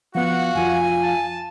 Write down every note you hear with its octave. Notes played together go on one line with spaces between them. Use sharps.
F3 B3 F#4 F5 F#5
F2 F3 F4 G#5
A5